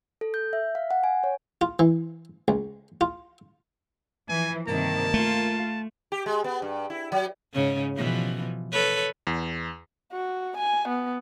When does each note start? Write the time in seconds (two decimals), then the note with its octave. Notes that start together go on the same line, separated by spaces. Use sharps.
0.21 A4
0.34 G6
0.53 E5
0.75 F5
0.91 F#5
1.04 G#5
1.24 C#5
1.61 F4
1.79 E3
2.48 C#2
3.01 F4
4.29 E3 F3 G#5
4.67 G2 C3 D#3 A#3 A5
5.14 A3 F4
6.12 G4
6.26 G#3
6.44 B3
6.62 G2
6.90 E4
7.12 F#3
7.53 G#2 C#3 C#4
7.96 B2 E3 F3
8.72 A4 B4 C#5
9.27 E2
10.12 F#4
10.57 G#5
10.88 B3